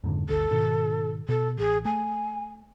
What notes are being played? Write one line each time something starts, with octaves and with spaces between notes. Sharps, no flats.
F2 G#2 D3
G1 D2 G2 A4
G#2 B2 D#3
B2 A4
A1 G#4
A3 G#5